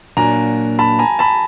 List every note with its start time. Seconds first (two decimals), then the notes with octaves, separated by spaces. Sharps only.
0.17 A#2 F#3 A#3 D4 G#5 A#5
0.79 A5 B5
0.99 G#5 A#5
1.19 A5 B5